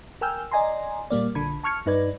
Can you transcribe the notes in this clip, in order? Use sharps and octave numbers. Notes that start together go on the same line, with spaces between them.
A#4 G5 G#5 E6 F6 G6
D5 D#5 G#5 A#5 C6
A#2 G3 A#3 D5
A#1 D3 B5 G#6
A5 C#6 F6 G#6 C#7
G2 D#4 B4 D5 G#6